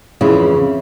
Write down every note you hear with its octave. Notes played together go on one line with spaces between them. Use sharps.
F2 C#3 E3 E4